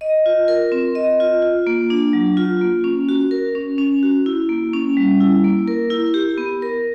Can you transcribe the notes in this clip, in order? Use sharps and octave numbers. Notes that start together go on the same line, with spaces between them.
D#5
F4
A#4
C4
D#5
F4
F4
A#3
D4
F#3
F4
A#3
C#4
F#4
A#4
C#4
C#4
F#4
E4
A#3
C#4
G3
E4
A#3
A#4
E4
G4
B3
A#4